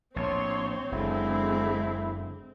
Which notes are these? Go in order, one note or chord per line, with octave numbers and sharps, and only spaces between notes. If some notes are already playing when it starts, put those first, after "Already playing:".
A#1 A2 C4 C#5 C6
F#1 D3 G#3 E4